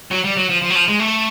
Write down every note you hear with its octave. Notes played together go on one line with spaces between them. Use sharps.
F#3
G3
F#3
F3
F3
F#3
F3
G#3
A3